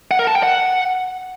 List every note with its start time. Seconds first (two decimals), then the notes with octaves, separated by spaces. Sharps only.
0.11 F#5
0.19 A#4
0.27 A5
0.35 G5
0.43 F#5